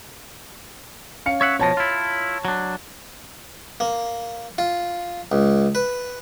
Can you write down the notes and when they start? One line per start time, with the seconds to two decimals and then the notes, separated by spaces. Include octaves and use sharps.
1.26 C#4 F5 C#7
1.41 C#5 E5 F#5
1.59 B2 F3 C#5 A5 A#6
1.77 E4 F4
2.45 F#3 D4
3.80 A#3
4.58 F4
5.32 C#2
5.75 B4